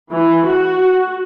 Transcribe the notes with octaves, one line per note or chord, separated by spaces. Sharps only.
E3
F#4